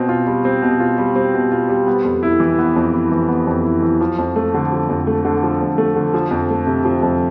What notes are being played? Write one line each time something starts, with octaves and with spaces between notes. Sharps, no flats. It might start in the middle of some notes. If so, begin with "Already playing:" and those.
Already playing: B2 C4
F4
G3
C4
B2
F4
G3
C4
B2
F4
G3
B3
F2
E4
E3
B3
F2
E4
E3
B3
F2
E4
E3
F3
F2
A3
D3
F3
F2
A3
D3
F3
F2
A3
D3
F3
F2
A3
C3
F3
F2